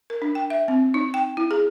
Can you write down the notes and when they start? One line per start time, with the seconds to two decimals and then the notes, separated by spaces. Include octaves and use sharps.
0.10 A#4
0.22 D4
0.35 G5
0.50 E5
0.68 C4
0.94 D#4
1.14 G5
1.37 E4
1.51 G#4